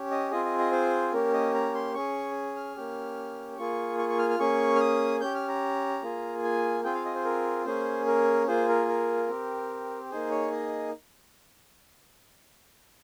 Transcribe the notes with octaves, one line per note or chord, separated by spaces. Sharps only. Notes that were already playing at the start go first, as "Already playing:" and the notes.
Already playing: C#4 G4
D#5
C4 F4 G#4 D#5
D#5
D#5
C5
A#3 C#4 G4 A#4
D#5
A#5
C6
C#4 G#4 C#6
F6
A#3 C#4 G4
A#3 F4 G#4 C#6
C#6
C#6
F6
F6
A#3 C#4 G#4 C#6
F6
D#6
C#4 G4 G6
F6
A#5
A#3 F4 G#4
G#5
C4 F4 G#4 G5
F5
D#5
C5
A#4
A#3 C#4 G#4 C5
A#4
A#3 F4 G#4 C5
A#4
A#4
C4 G4
A#3 D#4 G#4 C5
C#5
D#5